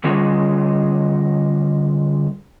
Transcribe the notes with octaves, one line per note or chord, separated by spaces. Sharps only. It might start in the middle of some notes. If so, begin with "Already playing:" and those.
D3 G3 G#3 C#4 F4